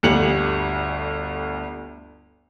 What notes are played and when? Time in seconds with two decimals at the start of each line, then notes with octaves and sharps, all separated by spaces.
0.03 G1 D2 G4 C#7 F7 F#7